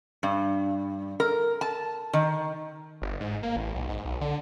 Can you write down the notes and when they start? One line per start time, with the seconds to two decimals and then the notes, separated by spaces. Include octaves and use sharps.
0.23 G2
1.20 A#4
1.61 A5
2.13 D#3
3.02 G1
3.20 G#2
3.43 A#3
3.56 A1
3.75 B1
3.89 G#2
4.05 B1
4.21 D3